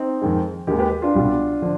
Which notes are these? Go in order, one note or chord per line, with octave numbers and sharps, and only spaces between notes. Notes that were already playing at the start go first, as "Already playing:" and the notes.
Already playing: C4 D#4
F2 D#3 G#3
D#2 D#3 G#3 D#4 G4
G4 B4
D4 F4
C2 B2 G3
D3 F3